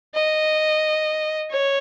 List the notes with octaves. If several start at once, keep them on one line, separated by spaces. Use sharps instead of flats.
D#5
C#5